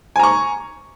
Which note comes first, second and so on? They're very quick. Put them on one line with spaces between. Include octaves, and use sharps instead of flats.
G#5 A#5 C#6